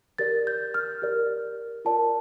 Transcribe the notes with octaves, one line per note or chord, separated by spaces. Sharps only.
G4 A#4 D5 A6
G6
F6
G4 A#4 D5
F4 A#4 D5 A5